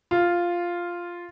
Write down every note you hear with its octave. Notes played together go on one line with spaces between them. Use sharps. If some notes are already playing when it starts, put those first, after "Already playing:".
F4